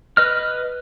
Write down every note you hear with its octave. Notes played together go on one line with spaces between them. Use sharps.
B4 D#5 F6